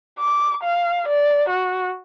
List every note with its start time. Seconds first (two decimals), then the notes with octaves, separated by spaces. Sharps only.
0.19 D6
0.64 F5
1.08 D5
1.49 F#4